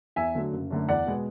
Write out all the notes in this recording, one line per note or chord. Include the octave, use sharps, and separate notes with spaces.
E2 E5 G#5
D3 F#3 A3
F#1
F#2 D3 A3
E2 D5 F#5
B2 G#3 B3